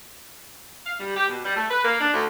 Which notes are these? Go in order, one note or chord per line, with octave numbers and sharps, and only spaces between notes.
F5
G3
G4
B2
G3
A3
B4
A#3
D4
D2